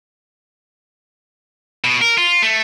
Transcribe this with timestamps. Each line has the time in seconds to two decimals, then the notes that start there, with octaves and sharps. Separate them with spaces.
1.84 B2
2.02 A#4
2.18 F4
2.43 A3